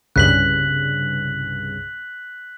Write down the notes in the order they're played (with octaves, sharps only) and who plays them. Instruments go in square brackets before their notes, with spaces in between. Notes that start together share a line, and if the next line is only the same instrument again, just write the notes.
[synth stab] C2 G2 C#3 [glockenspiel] F#6 B6 F#7